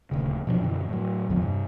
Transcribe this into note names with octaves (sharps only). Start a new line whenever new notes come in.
D#1 D2 C#3
B2 F3 G#3 D4
F#2 B2 D3 E3
A2 F#3
A1 E2 D3 F3
G2 C3